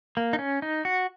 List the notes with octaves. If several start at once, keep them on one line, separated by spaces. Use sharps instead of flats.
A#3
D#4
C#4
D#4
F#4